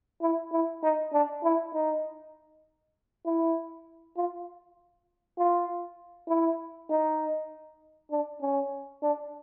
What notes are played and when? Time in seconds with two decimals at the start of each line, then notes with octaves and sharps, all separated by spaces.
0.21 E4
0.52 E4
0.83 D#4
1.13 D4
1.43 E4
1.73 D#4
3.25 E4
4.16 F4
5.38 F4
6.28 E4
6.90 D#4
8.11 D4
8.41 C#4
9.02 D4